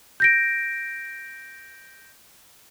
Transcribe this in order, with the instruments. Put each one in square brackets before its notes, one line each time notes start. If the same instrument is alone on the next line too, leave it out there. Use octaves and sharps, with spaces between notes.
[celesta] G6 A#6 D7